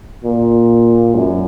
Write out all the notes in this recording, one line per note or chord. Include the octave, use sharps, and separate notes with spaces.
A#2
F#2